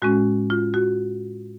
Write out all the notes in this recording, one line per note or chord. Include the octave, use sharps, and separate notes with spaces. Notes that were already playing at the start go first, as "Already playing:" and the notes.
A2 G#3 C#4 F#4
F4
F#4